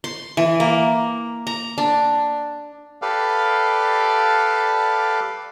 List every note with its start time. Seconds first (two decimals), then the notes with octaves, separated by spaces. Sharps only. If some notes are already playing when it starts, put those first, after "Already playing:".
0.04 C6
0.37 E3
0.60 A#3
1.47 A#5
1.78 D4
3.02 G4 A4 B4 D5 F5